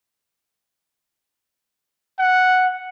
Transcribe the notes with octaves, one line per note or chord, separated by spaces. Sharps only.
F#5